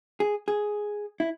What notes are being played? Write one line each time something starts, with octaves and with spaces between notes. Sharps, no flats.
G#4
G#4
E4